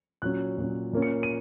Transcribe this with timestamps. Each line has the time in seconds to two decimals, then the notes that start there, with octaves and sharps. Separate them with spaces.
0.22 A#2 F#3 C#4 F#6
0.57 A#2 F#3 C#4
0.93 A#2 A#3 C#4
1.02 C#7
1.23 D#7